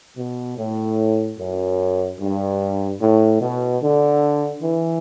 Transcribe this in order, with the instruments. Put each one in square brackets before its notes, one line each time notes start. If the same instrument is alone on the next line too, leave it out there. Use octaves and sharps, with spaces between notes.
[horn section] B2
A2
F#2
G2
A2
B2
D3
E3